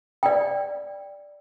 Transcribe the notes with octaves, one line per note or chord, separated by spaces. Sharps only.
D5 G5